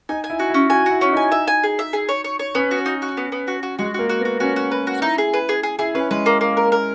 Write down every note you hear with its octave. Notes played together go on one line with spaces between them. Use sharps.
D#4 G#5
G#5
E4
F#4
E4
C#4
F#4 G#5
E4 F#4
C#4
D#4 G#5
E5
G#5
G#4
E5
G#4
C#5
C#5
C#5
B3 C#4
F#4
D#4
F#4
B3
B3
F#4
F#4
G#3 F#4
A#3 F#4
F#4
B3
F#4
C#4 F#4
F#4
B4
F#4
D#4 E4
G#4
B4
G#4
G#4
E4 G#4
C#4 B4
G#3 B4
A#3
A#3
A#4
A#4